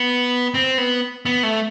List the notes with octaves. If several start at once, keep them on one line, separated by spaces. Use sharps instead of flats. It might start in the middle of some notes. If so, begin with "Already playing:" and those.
Already playing: B3
C4
B3
B3
A3